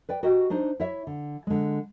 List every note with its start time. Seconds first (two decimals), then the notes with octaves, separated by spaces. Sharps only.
0.09 B4 D5 G5
0.23 F#4 G4 A#4 D#5 G5
0.50 D4 D#4 C5
0.80 E4 C#5 E5
1.07 D3
1.47 D3 G#3